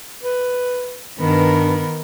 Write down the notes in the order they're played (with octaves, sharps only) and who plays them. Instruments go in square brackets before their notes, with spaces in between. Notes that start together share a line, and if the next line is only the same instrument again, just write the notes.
[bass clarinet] B4
[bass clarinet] G2 [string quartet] D#3 B3 A#4